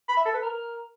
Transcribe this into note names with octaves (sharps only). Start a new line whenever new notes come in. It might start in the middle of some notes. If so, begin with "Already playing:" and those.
B5
E5
A4
B4
A#4